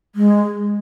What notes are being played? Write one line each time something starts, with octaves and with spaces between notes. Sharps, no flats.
G#3